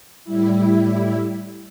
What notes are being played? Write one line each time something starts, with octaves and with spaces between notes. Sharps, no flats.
A2 G3 E4